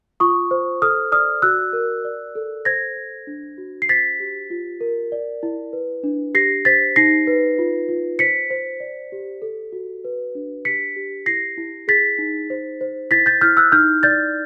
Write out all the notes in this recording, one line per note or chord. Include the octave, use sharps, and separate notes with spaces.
F4 C#6 D#6
C5
A4 D#6 F6
D5 D#6 F6
F#4 E6 F#6
A#4
D5
A4
C5 G#6 A#6
C5
D4
F#4
C7
C5 A6 B6
G4
F4
A#4
D5
E4
B4
D4
G4 A#6 C7
C5 A6 B6
D#4 A#6 C7
B4
F4
F4
C5 B6 C#7
C5
D5
G4
A4
F#4
B4
D4
G4 B6 C#7
G4
E4 A#6 C7
E4
G#4 A6 B6
D#4
C5
C5
E4 A6 B6
G6 A6
E4 F6 G6
E6 F#6
D#4 F6 G6
D5 G6 A6